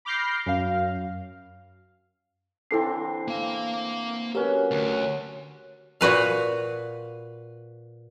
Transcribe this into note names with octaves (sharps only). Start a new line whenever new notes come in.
B5 D6 F6 G6 A#6 C7
F#2 F5
D3 E3 C4 E4 A4 C7
A#3 F5
F#3 C#4 G4 A#4 B4 F#5
D2 C#5 F#5
A#2 F#4 B4 F5